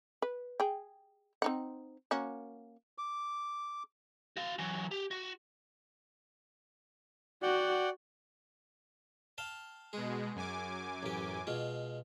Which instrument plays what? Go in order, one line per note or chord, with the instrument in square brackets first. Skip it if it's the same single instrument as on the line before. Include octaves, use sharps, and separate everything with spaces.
[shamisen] B4
G#4 G5
C4 D#4 F#5
A#3 C#4 F#4
[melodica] D6
[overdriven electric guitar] F#4 F5
E3 F#3
G4
F#4
[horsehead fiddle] F#4 [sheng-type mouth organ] D5 F#5 G5
[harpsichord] F5 G5 A5
[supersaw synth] B2 G#3 [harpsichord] G#4
[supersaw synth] F#2 G#5 D6
[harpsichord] A1 G4
B2 G#3 F4